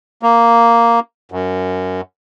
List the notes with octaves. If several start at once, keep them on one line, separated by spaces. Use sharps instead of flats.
A#3
F#2